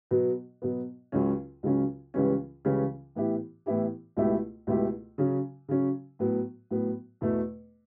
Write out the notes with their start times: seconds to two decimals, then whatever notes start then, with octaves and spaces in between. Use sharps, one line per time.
0.11 B2 F#3 B3
0.62 B2 F#3 B3
1.12 C#2 C#3 F#3 C#4
1.63 C#2 C#3 F#3 C#4
2.14 C#2 C#3 E3 G3 C#4
2.65 C#2 C#3 E3 G3 C#4
3.15 A2 E3 B3 E4 G4
3.66 A2 E3 B3 E4 G4
4.17 C#2 B2 A3 E4 G4
4.67 C#2 B2 A3 E4 G4
5.18 C#3 F#3 C#4
5.69 C#3 F#3 C#4
6.19 A2 F#3 B3
6.71 A2 F#3 B3
7.21 E2 B2 A3